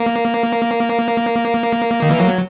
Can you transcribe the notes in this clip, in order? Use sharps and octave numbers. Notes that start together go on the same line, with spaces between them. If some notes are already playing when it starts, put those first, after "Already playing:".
Already playing: A#3
D#3
E3
F#3